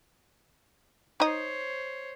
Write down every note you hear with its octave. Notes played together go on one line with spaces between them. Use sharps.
D#4 C5 C#5 D#5